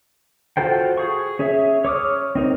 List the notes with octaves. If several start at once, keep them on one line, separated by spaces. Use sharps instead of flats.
F4 F#4 A4 C5 G5
G#4 C#6
C#4 G#4 C#5 E5
C#5 D6 D#6 F6
C4 D#4 A#4